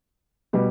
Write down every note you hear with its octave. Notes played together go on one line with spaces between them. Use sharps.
B2 G3